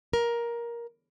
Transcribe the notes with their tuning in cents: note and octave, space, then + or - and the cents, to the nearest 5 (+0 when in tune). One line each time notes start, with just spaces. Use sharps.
A#4 +15